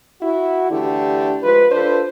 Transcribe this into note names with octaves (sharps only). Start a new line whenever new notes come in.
E4 F#4
D3 E3 A3 D4 G4
F3 G#3 F4 B4
D4 F4 A4 B4 C5